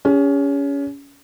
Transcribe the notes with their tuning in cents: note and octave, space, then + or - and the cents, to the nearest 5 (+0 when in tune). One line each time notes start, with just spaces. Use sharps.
C#4 +25 G#4 -40